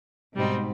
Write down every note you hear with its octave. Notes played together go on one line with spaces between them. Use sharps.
G#2 B2 G3 C4 D#4